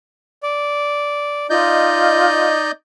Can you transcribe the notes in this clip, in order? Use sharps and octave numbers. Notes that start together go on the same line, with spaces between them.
D5
D#4 F4 D5 D#5 G6